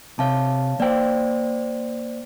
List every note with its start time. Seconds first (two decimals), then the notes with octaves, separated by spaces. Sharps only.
0.19 C3 C#5 F5 A5
0.80 A#3 C5 D5 G5